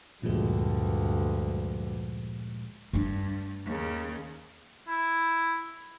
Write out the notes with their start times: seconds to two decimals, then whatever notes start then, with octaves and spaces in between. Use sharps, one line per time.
0.23 D2 G2 A#2 F3 G#3
2.93 G2 A3 D4
3.65 D#2 C#3
4.88 E4